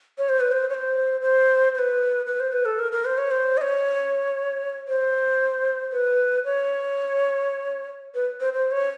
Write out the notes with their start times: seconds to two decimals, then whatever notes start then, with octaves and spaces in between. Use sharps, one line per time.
0.18 C#5
0.29 C5
0.40 B4
0.52 C5
0.70 C#5
0.74 C5
1.22 C5
1.75 C5
1.79 B4
2.26 B4
2.40 C5
2.53 B4
2.65 A4
2.79 A#4
2.92 A#4
3.05 C5
3.18 C#5
3.31 C5
3.57 D#5
3.62 C#5
4.88 C5
5.92 B4
6.45 C#5
8.15 B4
8.40 C5
8.53 C5
8.71 C#5